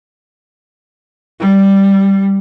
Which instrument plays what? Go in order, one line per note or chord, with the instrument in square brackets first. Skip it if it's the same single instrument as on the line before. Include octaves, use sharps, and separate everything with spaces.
[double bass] G3